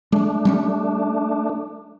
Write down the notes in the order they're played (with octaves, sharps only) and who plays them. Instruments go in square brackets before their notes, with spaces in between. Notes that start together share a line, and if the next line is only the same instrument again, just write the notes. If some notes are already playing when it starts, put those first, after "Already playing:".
[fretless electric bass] G#3 [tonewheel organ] A3 D4
[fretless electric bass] G3 A#3 C#4